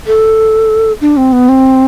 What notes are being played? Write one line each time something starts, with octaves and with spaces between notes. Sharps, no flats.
A4
D4
C4
B3
C4